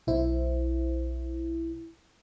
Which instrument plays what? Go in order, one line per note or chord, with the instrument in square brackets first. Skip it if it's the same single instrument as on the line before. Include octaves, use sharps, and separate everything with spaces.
[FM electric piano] B1 E4 C5